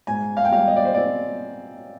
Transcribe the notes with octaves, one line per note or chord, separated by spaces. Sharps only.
G#2 G#5
F5
G5
G3 F5
D#5
D5
C5
C4 D5